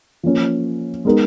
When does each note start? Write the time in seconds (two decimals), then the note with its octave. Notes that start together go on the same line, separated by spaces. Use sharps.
0.23 F3 A#3 C#4
1.05 G#3 B3 D#4 A#4